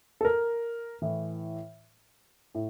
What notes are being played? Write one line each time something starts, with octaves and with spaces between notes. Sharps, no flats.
A4
A#4
A2 E3
A2